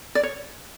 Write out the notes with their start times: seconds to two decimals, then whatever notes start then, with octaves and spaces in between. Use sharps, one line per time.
0.15 D5
0.23 C#5